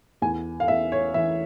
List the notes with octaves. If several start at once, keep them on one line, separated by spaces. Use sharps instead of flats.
E2 G#5
F5
E2 E5
C#5
E3 E5